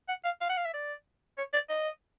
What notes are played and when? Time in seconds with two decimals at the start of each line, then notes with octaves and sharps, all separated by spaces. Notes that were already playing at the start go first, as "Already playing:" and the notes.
0.08 F#5
0.24 F5
0.41 F5
0.50 F#5
0.57 F5
0.65 E5
0.74 D5
1.38 C#5
1.53 D5
1.69 D#5